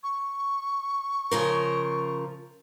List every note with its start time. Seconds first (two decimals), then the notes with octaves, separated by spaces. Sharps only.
0.03 C#6
1.31 C#3 F3 A#4